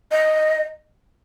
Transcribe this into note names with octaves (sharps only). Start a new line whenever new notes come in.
D#5